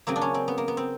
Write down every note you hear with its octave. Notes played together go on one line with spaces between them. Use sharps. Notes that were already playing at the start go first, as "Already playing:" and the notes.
C#3 F#3 A#3 C4
D4
C#4
C4
B3
A#3
B3
C4